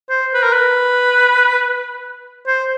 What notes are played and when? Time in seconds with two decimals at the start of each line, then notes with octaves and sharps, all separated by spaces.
0.10 C5
0.34 B4
0.43 A#4
0.53 B4
2.47 C5